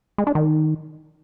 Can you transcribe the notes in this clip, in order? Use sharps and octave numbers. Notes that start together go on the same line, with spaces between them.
G#3
D4
D#3